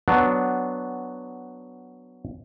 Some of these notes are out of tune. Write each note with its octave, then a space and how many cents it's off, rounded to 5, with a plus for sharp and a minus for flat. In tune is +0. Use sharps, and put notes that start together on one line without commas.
F#3 +0 B3 +0 D4 +0